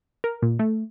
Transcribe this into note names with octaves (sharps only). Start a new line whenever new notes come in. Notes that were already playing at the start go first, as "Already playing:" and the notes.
A#4
A#2
A3